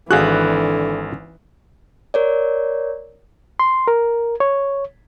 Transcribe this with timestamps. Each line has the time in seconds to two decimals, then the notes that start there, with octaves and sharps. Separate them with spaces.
0.11 G#1 D3 E3 F#4 G#4 F5 F#6
2.14 A#4 C#5 D5
3.60 C6
3.88 A#4
4.40 C#5